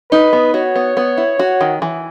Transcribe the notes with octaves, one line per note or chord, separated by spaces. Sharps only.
D#4 B4
B3
F#4 C#5
B3
B3
E4
F#4
D#3
E3